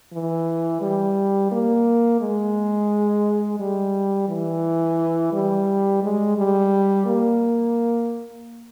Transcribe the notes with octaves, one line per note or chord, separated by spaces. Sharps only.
E3
G3
A#3
G#3
G3
E3
G3
G#3
G3
A#3